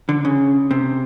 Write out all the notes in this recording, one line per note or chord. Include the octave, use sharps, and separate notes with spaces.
D3
C#3
C3